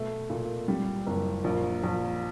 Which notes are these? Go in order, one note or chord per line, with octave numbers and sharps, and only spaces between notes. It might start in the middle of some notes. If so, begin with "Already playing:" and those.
Already playing: B2 A3
A#2
G3
F#1
A#1
A#1